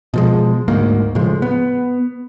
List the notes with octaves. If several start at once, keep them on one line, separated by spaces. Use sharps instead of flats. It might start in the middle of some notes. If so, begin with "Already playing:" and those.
B2 F3 G#3
D2 G#2 A#3
A2 C#3 F3 G#3
B3